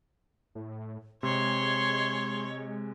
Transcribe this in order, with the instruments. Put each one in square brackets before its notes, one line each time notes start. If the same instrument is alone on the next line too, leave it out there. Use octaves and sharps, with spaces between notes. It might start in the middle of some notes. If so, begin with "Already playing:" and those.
[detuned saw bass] A2
[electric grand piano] C3 [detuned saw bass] G#3 [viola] C#5 [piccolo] C6